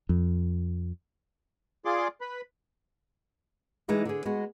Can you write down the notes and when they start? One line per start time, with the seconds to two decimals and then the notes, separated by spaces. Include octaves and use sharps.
0.09 F2
1.85 F4 G#4 D5 C6 D6
2.21 B4 B5
3.88 E3 G#3 D#4 E4 G4
4.05 D3 G#4
4.25 G#3 B3 F#4